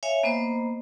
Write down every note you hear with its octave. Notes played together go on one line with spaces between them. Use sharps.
C#5 E5 F5 G#5
A#3 B3 C5 D#5